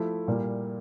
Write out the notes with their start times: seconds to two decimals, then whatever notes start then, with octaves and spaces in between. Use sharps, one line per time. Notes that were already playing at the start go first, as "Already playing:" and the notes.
Already playing: F3 A3 E4
0.28 A#2 G3 A#3 E4